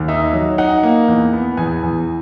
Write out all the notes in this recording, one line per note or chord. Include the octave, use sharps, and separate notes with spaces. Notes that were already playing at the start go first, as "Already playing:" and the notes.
Already playing: D#2
D#4 E5
F#3
D#4 F#5
A#3
E2
B3
E2 G#5
E2